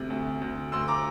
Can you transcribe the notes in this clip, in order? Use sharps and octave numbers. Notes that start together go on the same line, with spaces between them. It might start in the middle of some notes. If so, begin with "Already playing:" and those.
Already playing: D2 C3
D2
D2
D2 C6 E6
A#5 D6